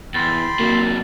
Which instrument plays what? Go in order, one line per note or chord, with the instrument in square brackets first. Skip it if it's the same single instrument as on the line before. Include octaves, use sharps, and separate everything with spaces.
[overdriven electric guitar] E2 [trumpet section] G5 B5 C6 [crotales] A6
[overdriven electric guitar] C3 F#3 [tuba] A#3